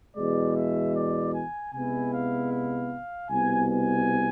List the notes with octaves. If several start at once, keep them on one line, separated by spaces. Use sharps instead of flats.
E2 B2 G#3 D5
E5
D5
G#5
C3 G#3 B3 E4 G#5
F5
F5
C2 B2 B3 G#5
G#5